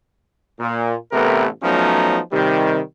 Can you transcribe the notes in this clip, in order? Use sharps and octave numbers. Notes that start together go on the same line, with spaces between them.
A#2
A1 C3 A3 B3 A#4 B4
F3 F#3 A3 B3 C#4 D#4
C3 D#3 G3